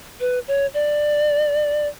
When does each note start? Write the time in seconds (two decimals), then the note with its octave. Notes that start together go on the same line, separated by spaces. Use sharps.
0.20 B4
0.48 C#5
0.74 D5